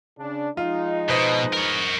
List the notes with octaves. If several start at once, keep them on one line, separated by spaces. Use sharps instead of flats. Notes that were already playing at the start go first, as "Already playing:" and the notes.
C#3 D4
F3 G#3 D#4 F4
B2 B4 C5 D#5
A#4 C#5